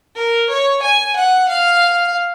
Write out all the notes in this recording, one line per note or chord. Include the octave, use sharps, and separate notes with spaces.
A#4
C#5
G#5
F#5
F5